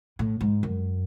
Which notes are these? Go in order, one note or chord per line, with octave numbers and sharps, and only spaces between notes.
A2
G#2
F#2